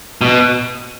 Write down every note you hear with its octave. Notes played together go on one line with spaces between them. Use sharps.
B2